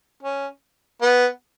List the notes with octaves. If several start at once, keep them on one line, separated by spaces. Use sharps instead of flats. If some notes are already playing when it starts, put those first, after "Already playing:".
C#4
B3